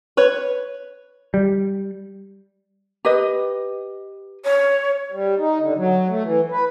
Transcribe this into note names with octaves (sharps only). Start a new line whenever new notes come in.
B4 C#5
G3
G4 B4 D#5
C#5
G3
D#4
D3
F#3
A3
E3
B4